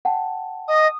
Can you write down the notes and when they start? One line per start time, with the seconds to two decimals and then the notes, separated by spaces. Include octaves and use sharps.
0.05 F#5 G5 A5
0.68 D#5 D#6